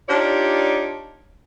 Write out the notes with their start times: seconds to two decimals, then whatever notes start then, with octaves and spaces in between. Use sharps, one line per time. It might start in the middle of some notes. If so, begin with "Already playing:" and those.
0.09 D4 D#4 F4 G4 C#5 D5